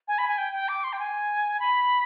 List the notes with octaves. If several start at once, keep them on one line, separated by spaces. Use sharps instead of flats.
G#5
B5
G#5
G5
G5
D6
C6
G5
G#5
B5